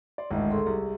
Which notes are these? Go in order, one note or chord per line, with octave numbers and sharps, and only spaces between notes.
D5 C6
G#1 D2 A2 G#3 D#5
G#4 A4 C6
C2 G4 G#4